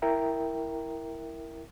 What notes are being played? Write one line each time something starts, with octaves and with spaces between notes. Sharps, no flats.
E4 A#4 E5 G5 A#5